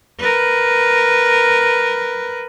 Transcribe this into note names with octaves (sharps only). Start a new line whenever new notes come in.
A#4 B4